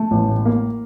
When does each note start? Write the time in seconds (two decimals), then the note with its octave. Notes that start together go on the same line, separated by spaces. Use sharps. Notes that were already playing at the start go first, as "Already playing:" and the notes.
Already playing: A3
0.11 A1
0.28 A2
0.45 A#3